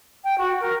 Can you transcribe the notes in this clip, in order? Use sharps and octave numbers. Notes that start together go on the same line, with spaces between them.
G5
F#4
A#4